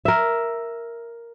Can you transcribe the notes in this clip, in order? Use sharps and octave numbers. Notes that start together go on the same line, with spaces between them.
A#4 E5